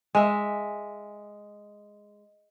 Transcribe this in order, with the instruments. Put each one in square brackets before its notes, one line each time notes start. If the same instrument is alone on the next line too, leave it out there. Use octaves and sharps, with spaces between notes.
[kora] G#3 E5